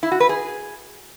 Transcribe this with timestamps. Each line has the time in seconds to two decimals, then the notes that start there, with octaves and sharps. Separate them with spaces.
0.03 E4
0.12 F#4
0.20 B4
0.29 G#4